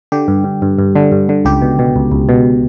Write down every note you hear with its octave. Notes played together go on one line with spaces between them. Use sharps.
D3 G4
G2
G2
G2
G2
D3
G2
D3
C#2 G4
B2
B2
C#2
C#2
B2